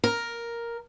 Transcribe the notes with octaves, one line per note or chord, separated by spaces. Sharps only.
A#4